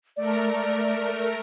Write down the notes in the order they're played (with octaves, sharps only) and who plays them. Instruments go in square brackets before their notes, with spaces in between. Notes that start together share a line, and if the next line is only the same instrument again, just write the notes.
[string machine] A3 A#4 [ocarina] D5